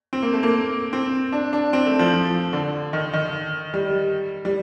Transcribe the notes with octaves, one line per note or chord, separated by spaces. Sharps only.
C4
A#3
A3
A#3
C4
D4
D4
C4
A3
F3
F3
D3
D#3
D#3
G3
G3